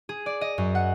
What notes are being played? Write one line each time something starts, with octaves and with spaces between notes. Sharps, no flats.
G#4
D5
D#5
F#2
F#5